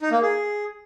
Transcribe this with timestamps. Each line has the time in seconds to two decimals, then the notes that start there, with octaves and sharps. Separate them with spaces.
0.01 D#4
0.11 A#3
0.22 G#4